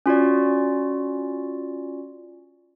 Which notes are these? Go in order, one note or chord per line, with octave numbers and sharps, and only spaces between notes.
C#4 F4 F#4 D5